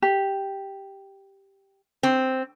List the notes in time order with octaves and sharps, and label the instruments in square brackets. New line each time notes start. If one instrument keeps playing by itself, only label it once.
[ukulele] G4
[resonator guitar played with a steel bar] C4